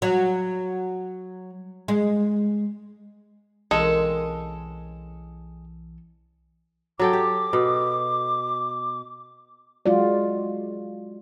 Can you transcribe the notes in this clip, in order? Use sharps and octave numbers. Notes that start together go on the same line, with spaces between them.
F#3
G#3
B1 E3 G#3 A#3 C4 C#4 A4
F#3 A4 G5 D6
G4
B2
F#3 G#3 F4 F#4 D5